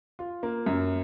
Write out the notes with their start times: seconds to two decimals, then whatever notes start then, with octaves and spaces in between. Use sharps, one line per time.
0.19 F4
0.43 A#3
0.66 F#2